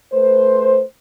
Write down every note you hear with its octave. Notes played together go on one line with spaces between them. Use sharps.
A3 B4 C5